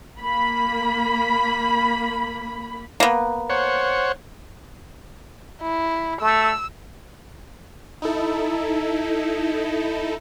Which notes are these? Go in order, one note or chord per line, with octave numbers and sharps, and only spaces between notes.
A#3 B5
A#3 B3
C5 C#5 F#5
E4
A3 E6
D#4 E4 A4